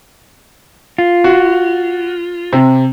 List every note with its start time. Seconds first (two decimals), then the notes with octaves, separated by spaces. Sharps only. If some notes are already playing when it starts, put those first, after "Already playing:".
0.98 F4
1.24 F#4
2.53 C3